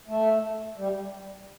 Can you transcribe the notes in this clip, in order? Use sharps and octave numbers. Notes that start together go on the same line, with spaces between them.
A3
G3